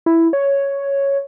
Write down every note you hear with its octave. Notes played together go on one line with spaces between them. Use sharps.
E4
C#5